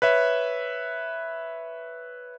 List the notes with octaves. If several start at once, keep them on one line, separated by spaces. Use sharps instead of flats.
B4 C#5 E5